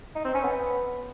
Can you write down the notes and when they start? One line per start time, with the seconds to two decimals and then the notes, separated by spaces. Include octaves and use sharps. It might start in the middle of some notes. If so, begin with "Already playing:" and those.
0.15 D#4
0.25 C4
0.34 C#4
0.44 B3